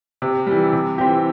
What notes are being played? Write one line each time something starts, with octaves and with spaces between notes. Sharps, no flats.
C3
E3 G3
C3
E3 C4 G4